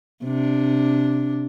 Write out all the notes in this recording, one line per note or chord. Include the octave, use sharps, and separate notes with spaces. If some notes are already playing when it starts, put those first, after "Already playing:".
C3 D4